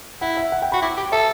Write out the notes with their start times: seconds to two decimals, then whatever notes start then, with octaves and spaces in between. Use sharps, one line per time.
0.21 E4 F#5
0.37 E5
0.52 F#5
0.62 G5
0.72 F#4 B5
0.82 E4 D6
0.97 G4 D6
1.12 A4 E5